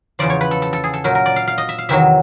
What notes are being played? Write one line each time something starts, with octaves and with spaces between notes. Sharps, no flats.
E2 C#3 F3 D5
C#5
B4
A4
A4
A4
G#4
A4
A#2 F#3 A#4
A#4
D5
F5
F5
D#5
E5
F5
E2 C3 D#3 F#3 E5